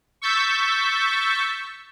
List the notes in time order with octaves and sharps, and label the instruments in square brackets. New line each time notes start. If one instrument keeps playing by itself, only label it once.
[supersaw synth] C#6 E6 G6 A6 B6